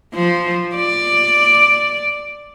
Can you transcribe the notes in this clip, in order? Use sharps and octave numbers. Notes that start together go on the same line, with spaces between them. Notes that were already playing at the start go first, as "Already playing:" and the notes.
F3
D5